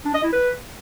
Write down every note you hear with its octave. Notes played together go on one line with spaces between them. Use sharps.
D4
D#5
E4
B4